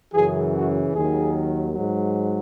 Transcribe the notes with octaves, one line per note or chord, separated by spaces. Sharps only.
F#2 C#3 E3 G#4
F#4
D#2 D#3 F#3 G#4
G#2 F#3